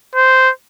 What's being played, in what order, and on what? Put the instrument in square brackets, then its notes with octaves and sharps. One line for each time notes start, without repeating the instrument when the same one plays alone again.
[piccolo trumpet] C5